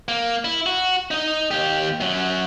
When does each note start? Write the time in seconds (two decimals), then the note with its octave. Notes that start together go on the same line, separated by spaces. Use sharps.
0.08 A#3
0.45 E4
0.66 F#4
1.11 D#4 D#5
1.51 D#2 G4
2.01 F#2 F#3